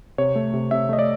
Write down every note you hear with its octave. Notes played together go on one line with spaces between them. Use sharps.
C3 C#5
A3
C3
C3 E5
A3 D#5
D5